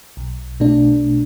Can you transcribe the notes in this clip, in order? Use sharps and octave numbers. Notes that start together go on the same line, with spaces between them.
B1
B2 A3 D4